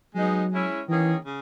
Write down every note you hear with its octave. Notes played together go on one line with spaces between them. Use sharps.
F#3 G#3 B3 D#4 G#4
G#3 C#4 E4
D#3 E3 A#3 C#4 G#4
C#3